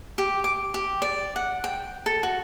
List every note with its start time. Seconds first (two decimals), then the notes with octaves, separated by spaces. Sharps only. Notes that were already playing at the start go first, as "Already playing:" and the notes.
0.18 G4
0.44 D6
0.74 G4
1.02 D5
1.36 F#5
1.64 G5
2.06 A4
2.23 F#4